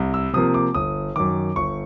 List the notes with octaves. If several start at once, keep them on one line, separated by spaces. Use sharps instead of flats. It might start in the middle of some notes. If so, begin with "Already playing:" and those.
Already playing: C2
E6
C3 F3 A#3 D#6
D6
G1 D#6
F#2 D#3 D6
G1 C#6